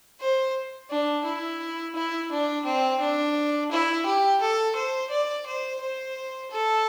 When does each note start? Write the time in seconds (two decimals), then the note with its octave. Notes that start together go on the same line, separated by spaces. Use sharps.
0.21 C5
0.91 D4
1.25 E4
1.95 E4
2.31 D4
2.65 C4
3.00 D4
3.72 E4
4.06 G4
4.41 A4
4.76 C5
5.11 D5
5.46 C5
5.81 C5
6.51 A4